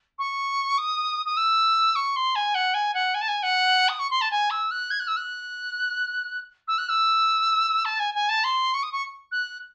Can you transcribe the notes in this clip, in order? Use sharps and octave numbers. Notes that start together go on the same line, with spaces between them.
C#6
D#6
D#6
E6
C#6
C6
G#5
F#5
G#5
F#5
G#5
A5
G#5
F#5
D#6
C#6
C6
A5
G#5
E6
F#6
G#6
F#6
E6
F#6
E6
F#6
E6
A5
G#5
G#5
A5
C6
C#6
D#6
C#6
F#6